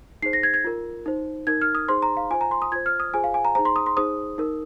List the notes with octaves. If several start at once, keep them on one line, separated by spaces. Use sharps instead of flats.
D#4 G#4 C5 C7
A#6
G#6
G#6
F4 A#4
D#4 C5
D#4 A#4 G#6
F6
D#6
D#4 G#4 C5 C6
A#5
F5
F4 C5 G#5
A#5
C6
D#6
F4 C5 G#6
F6
D#6
F4 G#4 C5 G#5
F5
G#5
A#5
D#4 G#4 C5 A#5
C6
D#6
C6
D#4 G#4 C5 D#6
D#4 A#4